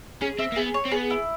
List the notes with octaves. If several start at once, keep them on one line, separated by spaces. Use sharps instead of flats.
C#4 G#4
C4 E5
A#3
B3 G#4
C#5
C4
B3 G#4
E4